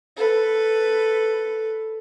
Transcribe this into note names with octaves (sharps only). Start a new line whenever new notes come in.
A4 B4